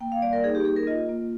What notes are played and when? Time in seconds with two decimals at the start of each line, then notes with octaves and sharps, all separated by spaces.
0.01 A#3 G5
0.12 F5
0.22 G3 D5
0.33 A#4
0.44 D#4 G#4
0.55 G4
0.65 A#3 G#4
0.76 A#4
0.87 F4 D#5
1.09 A#3